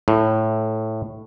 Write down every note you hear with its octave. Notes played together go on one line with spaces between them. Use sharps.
A2